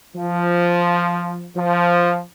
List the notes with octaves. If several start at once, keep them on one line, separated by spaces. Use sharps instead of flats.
F3
F3